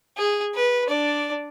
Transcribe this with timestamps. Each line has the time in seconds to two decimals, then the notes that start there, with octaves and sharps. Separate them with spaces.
0.18 G#4
0.55 B4
0.87 D4 D5